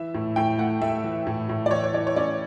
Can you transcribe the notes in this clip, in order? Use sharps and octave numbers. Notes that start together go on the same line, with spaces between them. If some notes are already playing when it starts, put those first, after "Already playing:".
Already playing: E3 E5
A2
A2 G5
A3 F#5
A3 E5
E3
A2
A2
D5
E3 C#5
C#5
E3 D5
C#5
C#4 D5